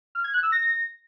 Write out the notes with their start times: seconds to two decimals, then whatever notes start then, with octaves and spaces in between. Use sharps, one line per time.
0.15 F6
0.24 G#6
0.33 F#6
0.43 E6
0.52 A#6